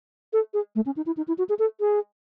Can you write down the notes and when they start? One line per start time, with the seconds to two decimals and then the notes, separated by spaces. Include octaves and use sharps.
0.33 A4
0.54 G#4
0.75 A3
0.86 C#4
0.97 D#4
1.06 E4
1.17 D#4
1.28 E4
1.38 F#4
1.49 G#4
1.59 A4
1.80 G#4